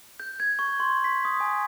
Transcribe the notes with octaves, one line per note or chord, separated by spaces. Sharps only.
G6
G#6
C#6
C6
B6
D#6
G#5